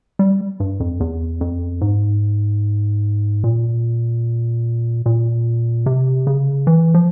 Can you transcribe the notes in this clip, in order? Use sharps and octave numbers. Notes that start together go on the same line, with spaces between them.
G3
G2
F2
E2
F2
G#2
A#2
A#2
C3
C#3
E3
F3